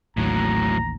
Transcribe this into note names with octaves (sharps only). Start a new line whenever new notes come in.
A1 D#2 A2 F#3 A#5